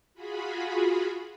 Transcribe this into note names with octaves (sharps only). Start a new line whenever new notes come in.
F4 F#4 G#4 B5